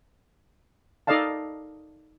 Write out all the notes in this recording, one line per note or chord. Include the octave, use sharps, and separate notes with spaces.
D#4 A4 D5 D#5 F5 A5